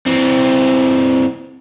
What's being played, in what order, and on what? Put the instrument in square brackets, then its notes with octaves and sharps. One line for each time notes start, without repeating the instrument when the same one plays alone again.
[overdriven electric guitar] E3 C4